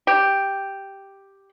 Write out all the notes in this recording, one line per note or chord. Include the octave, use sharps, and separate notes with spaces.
G4